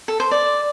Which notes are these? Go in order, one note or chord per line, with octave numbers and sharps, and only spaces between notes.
A4
C5
D5